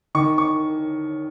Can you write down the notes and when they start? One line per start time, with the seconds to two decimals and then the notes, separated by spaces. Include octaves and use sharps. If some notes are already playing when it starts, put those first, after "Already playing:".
0.15 D#3 C#6
0.38 C#6